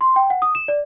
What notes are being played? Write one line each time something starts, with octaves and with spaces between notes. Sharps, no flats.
C6
G5
F#5
D#6
E7
D5